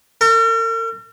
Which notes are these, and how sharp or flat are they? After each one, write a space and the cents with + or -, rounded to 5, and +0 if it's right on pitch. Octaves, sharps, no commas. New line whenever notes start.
A#4 -45